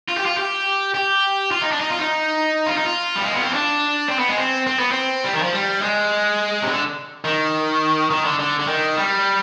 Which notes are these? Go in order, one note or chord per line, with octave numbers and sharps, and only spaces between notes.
F4
G4
F4
G4
G4
F4
D#4
D4
D#4
F4
D#4
F4
D#4
F4
G3
G#3
B3
C4
D4
C4
B3
G#3
C4
C4
B3
C4
G3
D#3
F3
G3
G#3
C3
D3
D#3
D#3
D3
D3
D3
D#3
G3